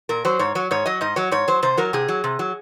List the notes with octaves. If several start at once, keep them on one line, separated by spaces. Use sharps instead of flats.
A#2 A#4
F#3 C5
G#2 C#5
F#3 C#5
G#2 C#5
F#3 D#5
G#2 D#5
F#3 C#5
G#2 C#5
F#3 C5
C3 C5
F#3 A#4
C3 G#4
F#3
C3
F#3